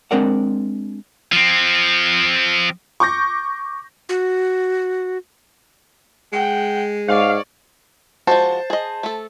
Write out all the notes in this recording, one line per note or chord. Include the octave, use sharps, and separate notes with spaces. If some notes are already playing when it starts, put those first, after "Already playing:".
G#3 C4 D4 A#4 D5 F#5
F3 C4
C#6 D6 G6 A#6
F#4
G#3 F#5 G5
G#2 C#5 D5 F5
F3 G#3 F#4 C5 A5
G#4 D#5
A3 A4